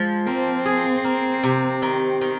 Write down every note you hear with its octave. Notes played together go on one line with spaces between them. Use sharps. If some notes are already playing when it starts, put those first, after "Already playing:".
Already playing: F3 G#3
A#3 C4
G#4
A#3
C3
D#3
D#3